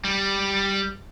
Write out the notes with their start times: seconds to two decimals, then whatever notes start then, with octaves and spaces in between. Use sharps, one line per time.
0.04 G3